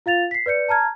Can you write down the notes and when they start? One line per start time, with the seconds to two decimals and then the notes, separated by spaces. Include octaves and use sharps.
0.06 F4 F5 A6 F7
0.31 B6 C7
0.46 B4 D5 G6 C#7
0.69 A5 A#5 F6 G#6